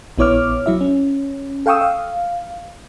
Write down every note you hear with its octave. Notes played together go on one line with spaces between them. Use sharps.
A#1 B3 E4 C#5 D6 F6
F#3 E4 E5
C#4
A4 F5 G5 C#6 D#6 E6
F5